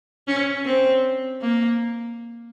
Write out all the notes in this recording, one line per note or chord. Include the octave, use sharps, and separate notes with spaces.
C#4
C4
A#3